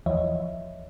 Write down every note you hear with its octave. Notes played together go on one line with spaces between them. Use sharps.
E2 E3 F3 C#5 D#5 E5